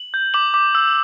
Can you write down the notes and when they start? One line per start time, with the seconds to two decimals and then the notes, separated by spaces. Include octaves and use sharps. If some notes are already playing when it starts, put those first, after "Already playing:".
Already playing: F#7
0.14 G6
0.34 D6 F#7
0.54 D6
0.75 E6